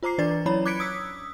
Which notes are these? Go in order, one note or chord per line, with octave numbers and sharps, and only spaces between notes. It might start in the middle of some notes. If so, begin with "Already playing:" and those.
F4 C5 A#5 D6 C7
E3 D4 B4 D5 A6
F#3 C#4 E4 C#5 A#5 B5
D6 F#6 G#6 B6 C#7 D7
D#6 E6 B6